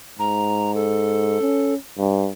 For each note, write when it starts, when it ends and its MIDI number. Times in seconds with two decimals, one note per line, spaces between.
0.19 1.39 44
0.19 0.71 82
0.75 1.74 69
1.41 1.76 61
1.98 2.30 43